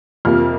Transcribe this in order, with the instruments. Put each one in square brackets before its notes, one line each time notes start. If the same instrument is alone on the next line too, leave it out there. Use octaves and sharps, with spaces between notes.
[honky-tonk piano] F2 C3 F3 A#3 F6